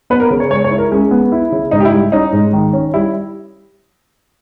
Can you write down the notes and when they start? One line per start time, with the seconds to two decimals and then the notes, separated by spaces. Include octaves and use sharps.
0.10 B3 B4
0.20 A#4
0.31 C#3
0.40 C#5
0.51 G#3 C#5
0.64 C#5
0.71 E4
0.78 A#4
0.91 G#3 C#4
1.11 B3
1.32 E4
1.52 C#3
1.71 G#2 D#4
1.80 G4
1.85 E4
1.92 G3
2.12 C#4 D#4
2.32 G#2
2.53 D#3
2.73 C#4
2.94 G3 E4